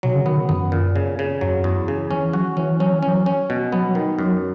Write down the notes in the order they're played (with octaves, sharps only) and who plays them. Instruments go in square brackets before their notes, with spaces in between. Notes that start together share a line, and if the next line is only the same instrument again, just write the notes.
[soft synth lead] B2 [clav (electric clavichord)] F#3
[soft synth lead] C#3
[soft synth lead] D#3 [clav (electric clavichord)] B3
[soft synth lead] D#3
[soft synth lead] F#2 [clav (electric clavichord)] B3
[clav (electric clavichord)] A#2
C#3
C#3
[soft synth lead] F#2 [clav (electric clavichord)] F#3
[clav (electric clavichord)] E2
C#3
[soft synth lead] E3 [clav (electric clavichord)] C#4
[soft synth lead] F#3 [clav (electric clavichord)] F#4
[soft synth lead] E3 [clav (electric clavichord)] C#4
[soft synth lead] F#3 [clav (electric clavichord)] C#4
[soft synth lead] E3
[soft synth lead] F#3 [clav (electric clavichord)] C#4
[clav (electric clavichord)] C#4
B2
[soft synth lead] F#3 [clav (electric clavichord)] B3
[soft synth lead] F#3
[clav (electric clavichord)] D#3
[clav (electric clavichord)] F#2 [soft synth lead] F#3